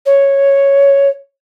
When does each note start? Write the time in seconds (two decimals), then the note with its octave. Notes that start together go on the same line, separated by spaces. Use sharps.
0.05 C#5